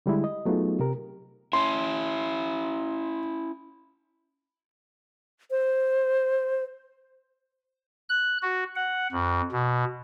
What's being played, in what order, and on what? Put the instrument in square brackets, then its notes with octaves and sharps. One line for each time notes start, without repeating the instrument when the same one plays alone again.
[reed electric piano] D3 G3 G#3 E4
D#5
F#3 A3 B3 D#4 F4 G#4
C3 G4 A#4
[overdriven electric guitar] C#4 E4 [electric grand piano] C6
[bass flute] C5
[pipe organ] F#6
F#4
F#5
F2
B2